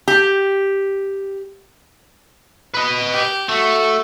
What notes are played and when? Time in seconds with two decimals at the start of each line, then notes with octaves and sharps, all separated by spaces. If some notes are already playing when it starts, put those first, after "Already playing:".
0.08 G4
2.74 B4 D#5
3.13 G4
3.49 A3 F#4